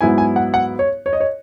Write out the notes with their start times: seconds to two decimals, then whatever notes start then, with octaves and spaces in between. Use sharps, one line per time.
0.01 G#2 F#3 B3 E4 G#5
0.18 G#5
0.36 F#5
0.54 F#5
0.79 C#5
1.06 C#5
1.13 D#5
1.20 C#5